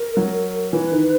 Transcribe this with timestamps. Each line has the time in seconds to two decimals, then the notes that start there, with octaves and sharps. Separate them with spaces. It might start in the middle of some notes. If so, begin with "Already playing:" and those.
Already playing: A#4
0.17 F#3
0.73 E3 B4
0.92 D#3